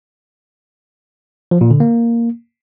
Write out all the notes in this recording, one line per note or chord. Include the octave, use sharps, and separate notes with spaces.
F3
A#2
D3
A#3